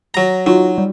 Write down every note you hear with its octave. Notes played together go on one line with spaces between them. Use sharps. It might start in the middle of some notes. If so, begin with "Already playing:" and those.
F#3 A#5 A#6
F#3 D#4 F4 F#4
G3